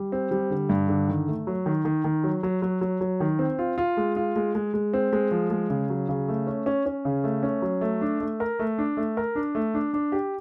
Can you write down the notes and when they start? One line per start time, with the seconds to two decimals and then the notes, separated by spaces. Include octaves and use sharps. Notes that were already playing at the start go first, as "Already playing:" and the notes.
Already playing: G3
0.12 C4
0.31 G3
0.50 D3
0.69 G2
0.88 D3
1.08 D#3
1.28 A3
1.47 F#3
1.66 D#3
1.85 D#3
2.04 D#3
2.24 F#3
2.43 F#3
2.62 F#3
2.81 F#3
3.01 F#3
3.20 D#3
3.39 C4
3.59 F4
3.78 F4
3.97 G#3
4.16 F4
4.36 G#3
4.55 G#3
4.74 G#3
4.94 C4
5.13 G#3
5.31 F3
5.50 G#3
5.70 C#3
5.90 F#3
6.09 C#3
6.28 A3
6.47 C#4
6.66 C#4
6.86 C#4
7.05 C#3
7.24 A3
7.43 C#4
7.62 F#3
7.81 A3
8.01 D4
8.21 A3
8.40 A#4
8.59 A3
8.78 D4
8.97 A3
9.17 A#4
9.35 D4
9.55 A3
9.74 D4
9.94 D4
10.12 G4